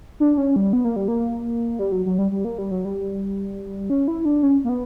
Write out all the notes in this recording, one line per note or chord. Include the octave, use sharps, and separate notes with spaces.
D4
C#4
G3
B3
A#3
G3
A#3
G3
F#3
F#3
G3
G3
A#3
G3
F#3
G3
C#4
E4
D4
C#4
A#3
B3